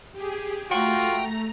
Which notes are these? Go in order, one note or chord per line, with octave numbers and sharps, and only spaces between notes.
G4 G#4
A3 F4 F#4 G5 A#5